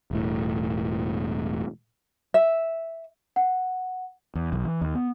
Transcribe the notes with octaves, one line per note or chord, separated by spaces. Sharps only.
E1 A2
E5
F#5
E2
B1
E3
D#2
B3